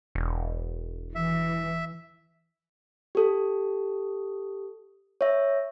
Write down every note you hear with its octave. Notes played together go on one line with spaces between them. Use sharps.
E1
E3 E5
G4 A4
C#5 E5